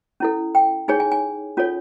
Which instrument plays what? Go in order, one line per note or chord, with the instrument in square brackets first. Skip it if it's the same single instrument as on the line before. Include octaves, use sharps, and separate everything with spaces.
[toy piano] C#4 E4 A4
G5
D#4 G#4 C#5 G#5
G#5
G#5
C#4 F4 A4 C#5